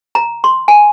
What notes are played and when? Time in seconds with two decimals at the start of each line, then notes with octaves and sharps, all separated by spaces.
0.15 A#5
0.44 C6
0.68 G#5